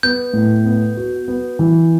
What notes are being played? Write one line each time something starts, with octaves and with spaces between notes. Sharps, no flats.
B3 G6
A2
B3
F#4
B3
E3